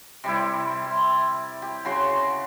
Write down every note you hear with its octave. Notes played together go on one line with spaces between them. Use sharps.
C3 G3 E4
C6
G4
C#3 F#4 C6 C#6